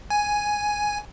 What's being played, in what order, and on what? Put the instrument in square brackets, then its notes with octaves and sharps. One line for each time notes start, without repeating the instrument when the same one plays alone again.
[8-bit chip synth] G#5